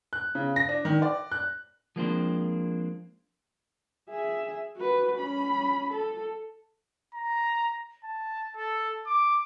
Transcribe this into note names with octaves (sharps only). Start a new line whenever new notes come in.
F#6
C#3
A#6
D4
D#3
D5
F#6
F3 G#3 A#3 C4 D4 C5
G#4 E5
F#4 B4
C#4 B5
A4
A#5
A5
A4
D6